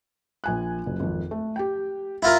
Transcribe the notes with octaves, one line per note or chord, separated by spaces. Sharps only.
A#1 G#5 F#6
F#1 F#3
G#1 F2
A3
G4 G5
E4 F4 A#4 B5